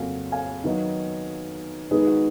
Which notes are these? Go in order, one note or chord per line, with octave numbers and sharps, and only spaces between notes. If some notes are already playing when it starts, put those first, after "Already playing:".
Already playing: F2 C#3 F#3 A#3 F5 G#5
F5 G#5
D#3 F#3 B3 D#4
D#3 G#3 B3 D#4 G#4 B4
F#4